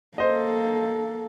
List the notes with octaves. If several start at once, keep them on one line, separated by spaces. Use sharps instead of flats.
A#3 A4 C5 D#5